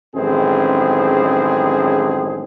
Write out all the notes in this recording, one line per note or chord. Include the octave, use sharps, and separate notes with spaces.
A1 F#2 D#3 G#3 C4 G#4